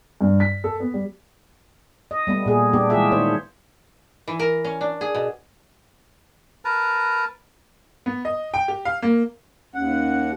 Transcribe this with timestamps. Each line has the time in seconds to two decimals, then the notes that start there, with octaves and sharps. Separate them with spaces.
0.21 G2
0.40 B6
0.64 A4
0.80 B3
0.94 G3
2.11 D#5
2.27 G3 A3 B3
2.46 A#2 G#4
2.73 B3 D4 G4
2.90 E3 G#3 F4 G4 G#4 E5
3.12 D#3 C5 C#5
4.28 E3
4.39 A#4
4.64 C#4
4.81 D4
5.01 G#4
5.15 B2
6.65 A#4 B4 A5 A#5
8.06 B3
8.25 D#5
8.54 G5
8.68 G4
8.85 F5
9.02 A#3
9.75 D#2 C#4 F#5